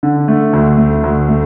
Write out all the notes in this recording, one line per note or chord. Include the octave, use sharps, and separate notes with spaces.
D3
A3
D2
A3
D2
A3